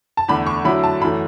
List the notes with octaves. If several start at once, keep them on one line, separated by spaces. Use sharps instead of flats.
A5
E2 D3 A3 B5
C#6
D3 F#3 A3 E4 B5
A5
F#2 E3 A3 B5